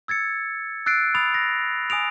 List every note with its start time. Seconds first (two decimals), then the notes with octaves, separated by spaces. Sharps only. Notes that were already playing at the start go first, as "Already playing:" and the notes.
0.08 E6 G#6 A6 C#7
0.86 E6 F#6 A6 C7 D7
1.15 B5 D#6 A6 F7
1.34 A#6
1.90 G#5 D#6 D7 F7